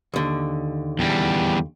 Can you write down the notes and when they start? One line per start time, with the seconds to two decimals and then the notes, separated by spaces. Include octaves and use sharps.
0.14 D#2 D3
0.99 E2 G3